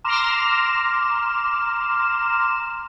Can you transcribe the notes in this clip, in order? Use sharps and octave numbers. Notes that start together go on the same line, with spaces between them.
A#5 C6 D6 F6 E7